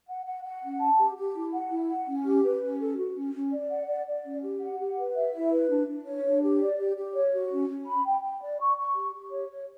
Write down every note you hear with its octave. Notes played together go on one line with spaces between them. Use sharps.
F#5
F#5
F#5
C#4
A5
G4
G4
E4
F#5
E4
F#5
C#4
G4
B4
C#4
A4
F#4
C#4
C#4
D5
F#5
D5
D5
C#4
G4
F#5
G4
B4
E5
E4
B4
D4
D4
C#5
D4
G4
D5
G4
G4
C#5
F#4
C#4
C#4
B5
G5
G5
D5
C#6
C#6
G4
G4
C#5
C#5